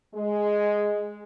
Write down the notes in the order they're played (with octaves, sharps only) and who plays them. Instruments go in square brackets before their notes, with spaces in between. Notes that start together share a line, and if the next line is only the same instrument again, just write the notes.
[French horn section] G#3